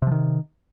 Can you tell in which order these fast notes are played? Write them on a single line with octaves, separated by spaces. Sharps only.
C3 F3 D#3